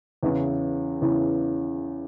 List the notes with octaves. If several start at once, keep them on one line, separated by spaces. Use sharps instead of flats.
E2 C#3 E3
E2 C#3 E3